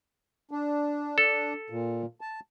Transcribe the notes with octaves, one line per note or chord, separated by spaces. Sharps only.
D4
A4
A#2
A5